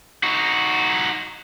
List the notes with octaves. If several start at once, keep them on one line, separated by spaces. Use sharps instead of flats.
D#4 F#4